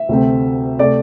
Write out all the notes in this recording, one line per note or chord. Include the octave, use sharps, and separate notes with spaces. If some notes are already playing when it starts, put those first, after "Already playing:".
Already playing: E5
D2 C3 A3 C4
C3 A3 D5